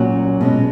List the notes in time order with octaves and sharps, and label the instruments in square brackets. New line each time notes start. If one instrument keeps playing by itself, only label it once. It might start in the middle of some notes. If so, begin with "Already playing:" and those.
Already playing: [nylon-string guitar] A#2 F#3 C#4 F#4
B2 G#3 C#4